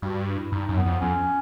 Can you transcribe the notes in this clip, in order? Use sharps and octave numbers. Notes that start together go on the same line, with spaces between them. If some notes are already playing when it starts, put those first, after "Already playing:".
G2 F#4
E4
G2 D#4
F#2
B3
F2
F2 C#4